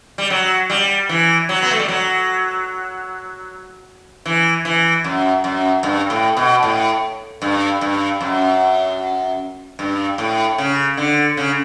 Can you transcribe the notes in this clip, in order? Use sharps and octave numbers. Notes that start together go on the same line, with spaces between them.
G3
F#3
G3
E3
F#3
B3
A3
G3
F#3
E3
E3
F#2
F#2
G2
A2
B2
A2
G2
G2
F#2
G2
A2
C#3
D3
C#3